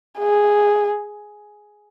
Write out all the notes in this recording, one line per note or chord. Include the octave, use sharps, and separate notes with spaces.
G#4